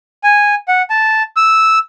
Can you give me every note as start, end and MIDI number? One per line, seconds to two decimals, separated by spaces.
0.24 0.55 80
0.68 0.82 78
0.90 1.23 81
1.36 1.79 88